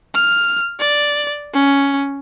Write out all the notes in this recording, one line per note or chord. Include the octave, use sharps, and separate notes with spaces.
F6
D5
C#4